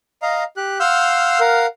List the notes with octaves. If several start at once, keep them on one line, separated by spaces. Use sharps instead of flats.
D#5 F5 A#5
G4 F#6
F5 F#5 C6 E6 F6 G6
A#4 F5 F#5